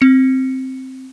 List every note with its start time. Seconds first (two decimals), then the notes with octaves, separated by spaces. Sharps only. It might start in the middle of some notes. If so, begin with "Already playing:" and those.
0.01 C4 C#7